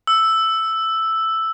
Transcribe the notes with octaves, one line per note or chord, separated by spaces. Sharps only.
E6